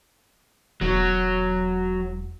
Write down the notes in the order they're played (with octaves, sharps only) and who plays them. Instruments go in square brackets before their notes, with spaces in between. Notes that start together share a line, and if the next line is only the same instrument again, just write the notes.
[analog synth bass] E1 [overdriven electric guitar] F#3